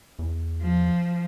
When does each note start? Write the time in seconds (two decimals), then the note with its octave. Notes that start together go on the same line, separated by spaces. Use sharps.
0.19 E2
0.62 F3